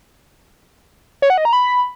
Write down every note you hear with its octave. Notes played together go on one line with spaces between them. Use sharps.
C#5
F#5
D#5
A#5
B5